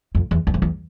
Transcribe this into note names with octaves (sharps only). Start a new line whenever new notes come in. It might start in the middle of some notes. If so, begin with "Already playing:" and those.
F2
E2
E2
F2
E2